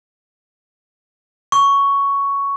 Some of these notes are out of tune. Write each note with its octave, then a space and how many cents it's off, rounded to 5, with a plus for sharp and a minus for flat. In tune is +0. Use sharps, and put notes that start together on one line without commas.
C#6 +5